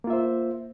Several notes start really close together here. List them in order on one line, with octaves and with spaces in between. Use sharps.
A#3 F4 E5 C5